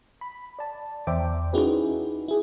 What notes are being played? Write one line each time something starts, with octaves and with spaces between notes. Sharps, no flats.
B5
D5 A5
E2 C5 D5 E5 G5 D6
C#4 D#4 E4 F#4 G#4 B4
E4 G#4